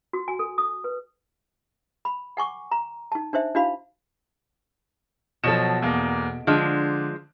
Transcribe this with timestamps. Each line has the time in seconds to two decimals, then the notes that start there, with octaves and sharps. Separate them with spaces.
0.13 F#4
0.28 G#5
0.39 A4
0.58 D#6
0.84 B4
2.05 B5
2.37 F#5 G#5 C#6 D6
2.71 A#5
3.12 D#4 A5
3.33 D4 D#4 C5 E5
3.55 D4 E4 F#4 F5 B5
5.44 B2 F3 F#3 A4 E7
5.82 E2 A#3
6.47 D3 F3 G#3 D4